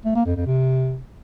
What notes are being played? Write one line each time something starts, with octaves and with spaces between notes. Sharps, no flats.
A3
A#3
F2
F2
C3